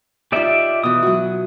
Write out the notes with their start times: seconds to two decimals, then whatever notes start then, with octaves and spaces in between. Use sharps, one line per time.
0.32 D#4 F4 G4 D5 E5
0.84 B2 E3 D#6
1.02 F#3 F#4